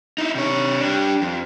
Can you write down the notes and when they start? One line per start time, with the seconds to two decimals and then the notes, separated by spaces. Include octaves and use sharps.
0.18 D#4 E4
0.35 C3 C#5
0.80 D4 G4
1.21 F2